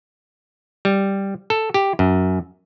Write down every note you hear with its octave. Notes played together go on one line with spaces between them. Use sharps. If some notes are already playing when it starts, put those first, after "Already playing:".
G3
A4
G4
F#2